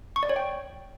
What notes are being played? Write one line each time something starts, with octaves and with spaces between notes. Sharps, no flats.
C#6
D5
C#5
G5